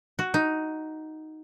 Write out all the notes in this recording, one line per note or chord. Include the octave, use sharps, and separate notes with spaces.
F#4
D#4